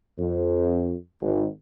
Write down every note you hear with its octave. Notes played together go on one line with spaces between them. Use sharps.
F2
G#1